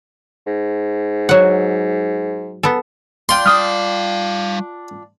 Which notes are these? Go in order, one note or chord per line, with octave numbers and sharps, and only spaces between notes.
G#2
F#3 F#5
B3 A4
D4 F4 G5 C6
G3 F5 D#6 F6